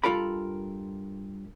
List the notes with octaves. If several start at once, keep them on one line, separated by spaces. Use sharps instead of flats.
G2 E3 F4 A4 A#4 B5